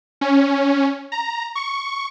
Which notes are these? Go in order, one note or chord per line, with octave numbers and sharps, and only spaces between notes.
C#4
A#5
C#6